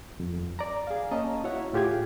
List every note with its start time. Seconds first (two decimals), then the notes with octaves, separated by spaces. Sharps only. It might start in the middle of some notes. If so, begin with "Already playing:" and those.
0.20 F2
0.59 D5 A#5
0.87 G#4 F5
1.11 A#3 C#4 D#5 A5 A#5
1.44 E4 F#4 C#5 E5 F#5
1.73 A2 F4 G4 G#4 G#6